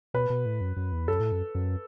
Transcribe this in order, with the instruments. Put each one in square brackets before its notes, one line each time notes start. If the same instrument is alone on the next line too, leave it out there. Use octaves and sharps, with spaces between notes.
[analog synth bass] B2 [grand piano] B4
[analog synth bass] B2
A2
F#2
F#2
E2
[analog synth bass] F#2 [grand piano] A4
[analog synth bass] A2
F#2
F#2